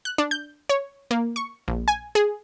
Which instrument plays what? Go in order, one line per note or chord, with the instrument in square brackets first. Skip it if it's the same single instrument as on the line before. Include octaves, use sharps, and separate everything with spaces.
[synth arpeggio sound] F#6
D4
G6
C#5
A#3
C#6
A#1
G#5
G#4